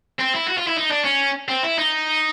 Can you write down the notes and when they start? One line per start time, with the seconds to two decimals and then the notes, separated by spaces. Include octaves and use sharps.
0.19 C4
0.33 E4
0.47 F#4
0.57 F4
0.67 E4
0.77 D#4
0.91 D4
1.05 C#4
1.49 C4
1.63 E4
1.78 D#4